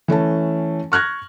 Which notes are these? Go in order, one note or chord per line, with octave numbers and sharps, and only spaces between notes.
E3 A3 C#4 A5
C#6 F6 F#6 G#6 A#6